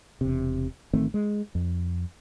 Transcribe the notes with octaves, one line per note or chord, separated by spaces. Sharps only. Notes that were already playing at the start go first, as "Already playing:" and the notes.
E1 C3
A1 D#3 A3 C4
G#3
F2